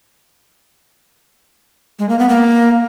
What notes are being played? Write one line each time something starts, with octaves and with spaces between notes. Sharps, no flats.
G#3
A#3
B3
A#3